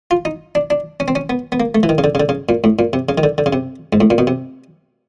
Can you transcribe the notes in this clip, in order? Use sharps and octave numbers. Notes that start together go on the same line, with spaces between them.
F4
D#4
D4
D4
C#4
C4
C#4
B3
B3
A#3
A3
E3
D#3
C#3
D3
C#3
D3
C#3
A#2
A2
A#2
C3
C#3
D#3
D3
D3
C#3
C3
G#2
A2
A#2
B2
C3